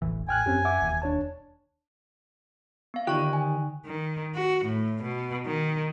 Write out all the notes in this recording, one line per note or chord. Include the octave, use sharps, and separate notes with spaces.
E1 A1 E3
A1 G5 G#5 F6 F#6
F#2 C4 C#4 G4
E5 F#5 D6
E1 D#2
D4 C#5 A5
B3 F5
D3 D#3 F4 G4 C#6 F#6
G#5
D#3
F#4
A2
B2
D#3